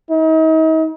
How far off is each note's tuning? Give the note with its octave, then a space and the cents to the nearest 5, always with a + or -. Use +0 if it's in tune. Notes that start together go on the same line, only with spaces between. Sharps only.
D#4 +40